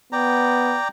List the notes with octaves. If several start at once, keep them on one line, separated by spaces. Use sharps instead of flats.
B3 D5 G5 A#5